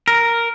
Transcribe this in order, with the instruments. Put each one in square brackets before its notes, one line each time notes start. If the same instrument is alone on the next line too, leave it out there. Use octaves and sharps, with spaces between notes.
[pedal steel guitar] A#4